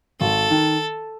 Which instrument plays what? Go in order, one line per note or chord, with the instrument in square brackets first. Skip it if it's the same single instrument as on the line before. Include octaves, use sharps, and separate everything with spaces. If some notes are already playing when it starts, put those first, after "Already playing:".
[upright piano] G#1 [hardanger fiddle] A4
[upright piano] D#3